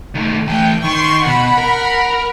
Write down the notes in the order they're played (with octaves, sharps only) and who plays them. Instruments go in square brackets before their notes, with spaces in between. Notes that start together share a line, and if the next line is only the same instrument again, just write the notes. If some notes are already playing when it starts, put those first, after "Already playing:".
[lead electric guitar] D#3 A3
[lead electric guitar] E3 A3 [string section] G5
[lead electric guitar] D#3 [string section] C6 C#6
[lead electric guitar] B2 [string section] F#5 B5
[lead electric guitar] A#4